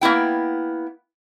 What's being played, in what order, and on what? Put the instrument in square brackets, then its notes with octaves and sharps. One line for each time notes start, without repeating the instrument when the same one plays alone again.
[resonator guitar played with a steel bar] A#3 B3 E4 G5